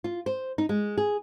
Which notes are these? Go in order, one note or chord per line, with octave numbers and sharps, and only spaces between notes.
F4
C5
D#4
G#3
G#4